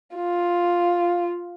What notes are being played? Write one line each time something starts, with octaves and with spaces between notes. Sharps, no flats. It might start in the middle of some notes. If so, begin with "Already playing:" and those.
F4